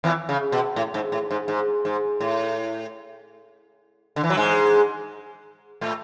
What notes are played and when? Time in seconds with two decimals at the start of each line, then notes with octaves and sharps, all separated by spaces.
0.04 E2 E3
0.29 C#3
0.52 B2
0.76 A2
0.94 G#2
1.12 A2
1.31 G#2
1.48 G#2
1.85 G#2
2.20 A2
4.16 D3
4.24 E3
4.30 F#3
4.37 G#2 G#3
5.81 A2 A3